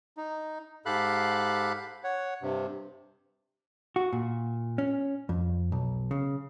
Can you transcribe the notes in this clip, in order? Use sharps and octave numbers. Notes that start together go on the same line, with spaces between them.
D#4
G#2 G4 A4 F5 B5 F#6
C#5 F#5
G2 C3
F#4
A#2
C#4
F2
B1
C#3